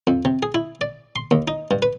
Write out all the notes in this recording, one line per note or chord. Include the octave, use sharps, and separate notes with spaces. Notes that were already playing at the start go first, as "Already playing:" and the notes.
F2
C3
G#4
E4
D5
C6
D#2
D#4
G2
B4